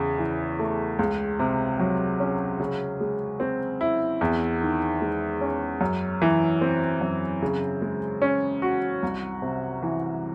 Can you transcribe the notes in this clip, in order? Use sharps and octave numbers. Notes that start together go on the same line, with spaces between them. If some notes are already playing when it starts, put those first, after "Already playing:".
Already playing: E2 C#3
E3
A3
C#2
C3
F#3
C#4
C#3
G#3
C4
E4
E2
D#3
G#3
C#4
F#2
E3
C4
F#2
C#3
G#3
C#4
F#4
C2
C3
E3